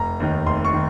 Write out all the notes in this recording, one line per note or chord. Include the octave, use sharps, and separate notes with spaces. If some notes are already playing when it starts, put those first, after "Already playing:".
Already playing: F1 A#5
D#2 D#3
F1 C6
C#6
D#3